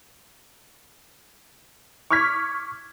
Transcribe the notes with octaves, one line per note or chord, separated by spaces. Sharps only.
C#6 D6 F6 G#6 B6